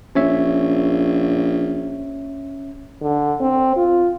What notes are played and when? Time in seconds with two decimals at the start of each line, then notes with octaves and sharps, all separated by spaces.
0.15 A#1 C#4 C#5 E5
3.02 D3
3.41 C4
3.76 F4